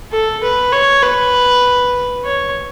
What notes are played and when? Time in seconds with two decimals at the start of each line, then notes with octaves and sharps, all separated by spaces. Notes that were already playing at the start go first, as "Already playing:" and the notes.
0.12 A4
0.43 B4
0.72 C#5
1.03 B4
2.24 C#5